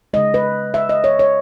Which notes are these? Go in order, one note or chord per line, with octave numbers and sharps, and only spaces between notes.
C#3 G#3 D#5
B4
E5
D#5
C#5
C#5